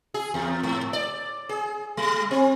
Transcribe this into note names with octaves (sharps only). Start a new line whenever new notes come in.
G#4
E2
G#2
D5
G#4
G3
C4